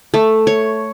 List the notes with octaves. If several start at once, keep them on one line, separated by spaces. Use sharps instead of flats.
A3
C#5